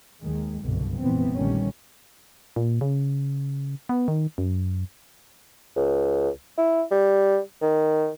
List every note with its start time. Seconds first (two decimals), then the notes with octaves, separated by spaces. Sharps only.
0.22 D#2 D#3 G#3
0.63 F#1 C2 G2 B2 D3
1.00 F1 A#1 E3 G#3 B3 C4
1.34 A#1 D3 D#3 G3 A3 C#4
2.56 A#2
2.81 C#3
3.89 B3
4.08 D#3
4.38 F#2
5.76 C#2
6.58 E4
6.91 G3
7.62 D#3